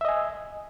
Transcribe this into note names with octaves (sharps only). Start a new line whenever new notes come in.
D#5 E5 G#5